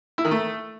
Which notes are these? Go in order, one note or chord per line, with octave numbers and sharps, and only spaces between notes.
E4
D#3
A3